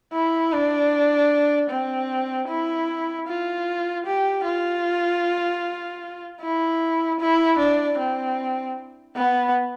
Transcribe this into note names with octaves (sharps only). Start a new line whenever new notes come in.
E4
D4
C4
E4
F4
G4
F4
E4
E4
D4
C4
B3